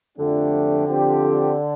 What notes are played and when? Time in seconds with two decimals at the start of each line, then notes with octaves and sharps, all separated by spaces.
0.18 F2 D3 F3 A3 D4 G4
0.87 F3 C4 G4